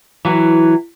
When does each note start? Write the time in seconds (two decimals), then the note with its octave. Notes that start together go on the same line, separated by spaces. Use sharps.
0.25 E3 F#3